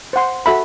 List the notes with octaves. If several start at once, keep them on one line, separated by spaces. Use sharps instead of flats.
C5 F#5 C6
F#4 A4 E5 B5